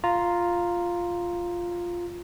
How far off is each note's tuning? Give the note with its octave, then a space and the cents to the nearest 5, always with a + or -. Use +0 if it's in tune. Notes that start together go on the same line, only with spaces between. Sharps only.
F4 +0 A#5 +0